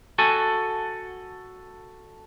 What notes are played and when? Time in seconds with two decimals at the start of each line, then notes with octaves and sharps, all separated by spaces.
0.18 F#4 A4 G#5